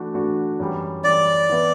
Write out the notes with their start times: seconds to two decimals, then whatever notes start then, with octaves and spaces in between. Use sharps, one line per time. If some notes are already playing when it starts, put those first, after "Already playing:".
Already playing: E3 A3 D4 F#4
0.14 E3 A3 D4 F#4
0.60 F#2 E3 G3
1.04 F#2 E3 G3 D5
1.50 E3 B3 E4